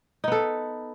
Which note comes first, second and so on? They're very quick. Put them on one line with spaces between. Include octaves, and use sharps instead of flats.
D#4 B3 A4